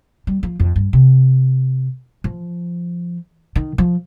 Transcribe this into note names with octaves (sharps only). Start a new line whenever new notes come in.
G3
F3
F2
G2
C3
F3
D#3
F3